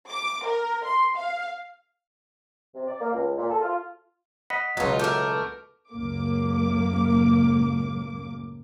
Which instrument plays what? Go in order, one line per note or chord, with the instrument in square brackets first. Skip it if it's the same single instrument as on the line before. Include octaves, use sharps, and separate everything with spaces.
[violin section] D6
A#4
C6
F5
[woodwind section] C3
D5
A#3
C#2
A#2
A4
F4
[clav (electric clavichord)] D#5 F#5 [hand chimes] B5 B6
[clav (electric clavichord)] C#2 B2 F#3 [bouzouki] D#4 F4
[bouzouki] A3 A#4 [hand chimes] B4 D6 G6
[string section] C#2 F#2 A2 A#3 D6